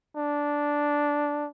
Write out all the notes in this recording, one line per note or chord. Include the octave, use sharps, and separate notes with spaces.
D4